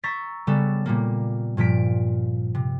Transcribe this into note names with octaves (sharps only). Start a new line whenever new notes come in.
A#5 C#6 E6 G6 A6 B6
C#3 G3 B3 A4
A#2 G3 A#3
G2 A#2 F3 B6 D7
C3